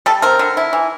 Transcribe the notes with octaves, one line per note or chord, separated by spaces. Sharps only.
G3 A4
C4 A#4
D3
E4
E3